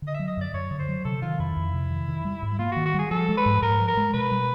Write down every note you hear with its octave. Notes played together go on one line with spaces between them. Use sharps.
D3
D#5
F#3 E5
D#5
F#2 D5
F#2 C#5
D3
C5
F#3
C3 A4
D#3 F4
F2 E4
F2
C3
D#3
D#3
G3
G#2
A#3 F4
D#3 F#4
F#4
G3 G#4
F3 A4
G#3
B4
G#2
G#2 A#4
F3
A#4
G#3
B2 B4
G3